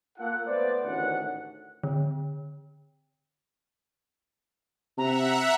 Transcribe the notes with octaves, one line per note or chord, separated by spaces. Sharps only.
A#3 F4 A4 F#5
A3 B3 C5 D5
A1 D2 D#3 C#4 F#5
D3
C3 E5 F#5 A#5